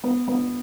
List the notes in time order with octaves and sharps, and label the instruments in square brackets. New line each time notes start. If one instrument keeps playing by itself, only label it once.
[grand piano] B3
B3